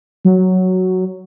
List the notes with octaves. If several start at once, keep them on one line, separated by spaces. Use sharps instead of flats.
F#3